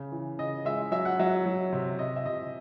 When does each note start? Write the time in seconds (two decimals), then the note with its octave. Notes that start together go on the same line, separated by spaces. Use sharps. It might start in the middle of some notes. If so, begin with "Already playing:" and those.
Already playing: C#3
0.12 E3
0.38 C#3 D#5
0.65 G#3 E5
0.92 F#3 E5
1.05 F#5
1.19 F#3 E5
1.45 F#3
1.72 C3
1.99 C3 D#5
2.16 E5
2.26 C3 D#5